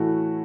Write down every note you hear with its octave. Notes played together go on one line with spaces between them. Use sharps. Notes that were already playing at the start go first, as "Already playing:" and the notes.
Already playing: A2 E3 A3 F#4